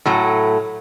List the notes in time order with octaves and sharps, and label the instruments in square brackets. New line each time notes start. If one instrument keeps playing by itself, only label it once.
[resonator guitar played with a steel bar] A2 F#3 A3